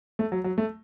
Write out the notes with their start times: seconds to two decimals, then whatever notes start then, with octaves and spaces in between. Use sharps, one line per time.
0.19 A3
0.32 F#3
0.44 F#3
0.58 A3